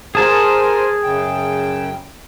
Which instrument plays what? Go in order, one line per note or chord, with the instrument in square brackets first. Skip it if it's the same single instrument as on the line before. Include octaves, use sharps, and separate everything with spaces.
[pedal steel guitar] G#4 A5 [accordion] A#4 C5 G#5
[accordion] F#2 C#3 G5